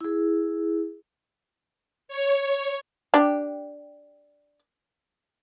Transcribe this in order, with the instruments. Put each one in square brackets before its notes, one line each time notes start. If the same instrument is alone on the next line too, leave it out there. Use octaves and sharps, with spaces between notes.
[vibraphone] E4 G#4
[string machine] C#5
[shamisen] D4 G4